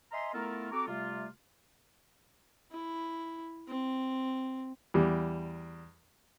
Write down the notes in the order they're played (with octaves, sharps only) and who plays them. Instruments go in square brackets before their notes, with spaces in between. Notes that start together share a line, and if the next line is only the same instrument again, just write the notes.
[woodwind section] D#5 E5 G#5 A#5 C6
A3 B3 E4 F4 A4 A#4
C4 F#4 A4 A#5 C#6 D6
C3 G3 A3 F4
[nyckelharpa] E4
C4
[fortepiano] E2 G3